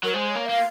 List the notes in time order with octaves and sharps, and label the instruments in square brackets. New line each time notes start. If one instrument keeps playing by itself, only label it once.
[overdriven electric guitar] F#3 [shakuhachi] A#4
[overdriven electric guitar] G#3 [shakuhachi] C5
[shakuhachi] C#5
[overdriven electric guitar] A#3
[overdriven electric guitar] A#3 [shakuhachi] F5